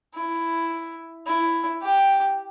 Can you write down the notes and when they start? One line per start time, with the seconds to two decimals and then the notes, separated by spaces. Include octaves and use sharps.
0.15 E4
1.27 E4
1.83 G4